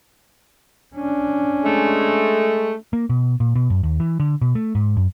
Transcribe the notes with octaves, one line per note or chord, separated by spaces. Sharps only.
C#4 D4
G#3 A3
A#3
B2
A#2
B2
F#2
D#2
E3
D3
B2
A3
G#2
F#2